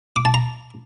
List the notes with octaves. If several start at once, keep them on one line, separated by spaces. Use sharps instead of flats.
D6
A5
A#5